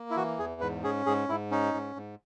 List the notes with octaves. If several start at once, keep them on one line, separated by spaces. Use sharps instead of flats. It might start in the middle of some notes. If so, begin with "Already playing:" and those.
Already playing: A#3
E4
E3 F#4
E2 G#4
G#2 B4
C#4 G#4
G#2 G#4
G#2 E4
C#4 D#4
G#2
G#2